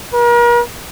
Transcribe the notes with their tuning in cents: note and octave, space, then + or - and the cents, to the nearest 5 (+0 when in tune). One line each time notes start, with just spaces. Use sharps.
A#4 +40